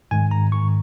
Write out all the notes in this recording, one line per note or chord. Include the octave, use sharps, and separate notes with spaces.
G#2 D#3 G#3 G#5
A#5
G#2 D#3 G#3 C#6